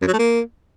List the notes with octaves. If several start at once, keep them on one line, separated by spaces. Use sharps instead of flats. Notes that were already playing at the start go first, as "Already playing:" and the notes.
F#2
F#3
A3
A#3